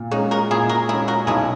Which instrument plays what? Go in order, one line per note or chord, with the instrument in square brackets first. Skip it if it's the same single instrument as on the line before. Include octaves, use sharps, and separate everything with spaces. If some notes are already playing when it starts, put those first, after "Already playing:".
Already playing: [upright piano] A#2
[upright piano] G#3 C#4 [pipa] D#4 F#4
[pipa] F#4 A#4
[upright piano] A#2 [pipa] E4 G#4
[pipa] F#4 A#4
[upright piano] G#3 [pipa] E4 G#4
[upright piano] C#4
[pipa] F#4 A#4
[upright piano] B1 [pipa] E4 G#4